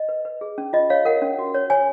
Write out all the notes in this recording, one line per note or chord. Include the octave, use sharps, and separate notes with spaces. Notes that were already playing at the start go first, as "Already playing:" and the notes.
Already playing: D#5
B4
B4
G#4
C#4
F4 D#5
C#5 F5
A#4 F#5
C#4
F#4
C#5
C#5 G#5